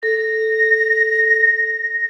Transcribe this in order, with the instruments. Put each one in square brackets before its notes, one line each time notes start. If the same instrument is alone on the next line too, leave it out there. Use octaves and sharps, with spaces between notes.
[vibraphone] A4 [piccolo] A#6